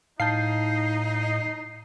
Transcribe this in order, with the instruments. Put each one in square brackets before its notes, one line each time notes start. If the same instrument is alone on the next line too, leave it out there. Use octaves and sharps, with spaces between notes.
[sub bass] A2 [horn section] D#4 [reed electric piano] F5 A5 G6 [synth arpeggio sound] C7